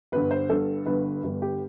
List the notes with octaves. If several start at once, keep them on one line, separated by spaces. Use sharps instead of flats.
G1 G2 D3 B4
C5
G1 G2 D3 A4
G1 G2 D3 B4
G1 G2 D3
G4